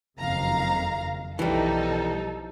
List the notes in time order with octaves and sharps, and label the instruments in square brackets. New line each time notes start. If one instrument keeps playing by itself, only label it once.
[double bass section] F#1 F2 D#3 [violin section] F5 A#5
[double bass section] B1 F3 [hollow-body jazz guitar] E3 G3 [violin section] D#4 A4